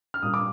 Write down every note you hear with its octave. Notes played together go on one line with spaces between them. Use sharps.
F6
A#2 G3 A#3 D#6
D6